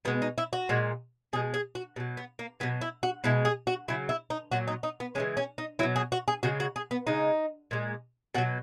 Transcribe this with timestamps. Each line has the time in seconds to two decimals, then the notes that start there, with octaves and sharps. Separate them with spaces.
0.05 B2 G#3 B3
0.22 D#4
0.38 E4
0.53 F#4
0.69 A#2 G#3
1.33 B2 G#3 G#4
1.54 G#4
1.75 F#4
1.96 B2 F#3
2.17 B3
2.39 A#3
2.60 B2 F#3 B3
2.81 E4
3.03 F#4
3.24 B2 G#3 E4
3.45 G#4
3.67 F#4
3.88 C#3 F#3 E4
4.09 E4
4.30 D#4
4.51 A#2 F#3 F#4
4.67 D#4
4.83 D#4
5.00 B3
5.15 C#3 E3 G#3 C#4
5.37 C#4
5.58 D#4
5.79 B2 F#3 E4
5.96 G#4
6.12 F#4
6.28 G#4
6.43 C#3 G#3 F#4
6.60 F#4
6.76 G#4
6.91 B3
7.07 C#3 G#3 D#4
7.71 A#2 G#3
8.35 B2 F#4
8.38 F#3